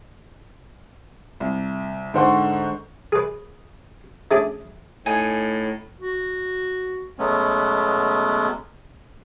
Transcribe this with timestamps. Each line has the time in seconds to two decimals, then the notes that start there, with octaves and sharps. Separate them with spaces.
1.40 C2
2.14 G#2 D3 C5 F#5 C6 C#6
3.12 G#4 B4
4.31 A3 C#4 D4 G#4
5.06 A2 D#4 G#5
6.00 F#4
7.19 B2 F#3 G#3 A3 B3 C#4